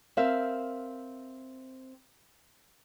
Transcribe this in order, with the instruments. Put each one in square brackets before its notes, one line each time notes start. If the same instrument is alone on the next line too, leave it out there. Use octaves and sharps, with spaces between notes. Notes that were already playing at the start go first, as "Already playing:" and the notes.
[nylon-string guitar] C4 A#4 E5 F5